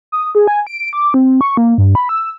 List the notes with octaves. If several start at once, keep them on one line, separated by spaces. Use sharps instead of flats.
D#6
G#4
G#5
D7
D6
C4
C#6
A#3
G2
B5
E6